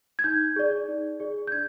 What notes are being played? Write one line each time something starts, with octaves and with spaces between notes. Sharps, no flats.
G#6
D#4 G6
G#4 D5
D#4
G#4 D5
G6
D4 G#6